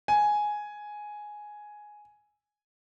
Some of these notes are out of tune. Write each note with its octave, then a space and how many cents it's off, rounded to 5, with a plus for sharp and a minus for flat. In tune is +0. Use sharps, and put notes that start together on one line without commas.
G#5 +5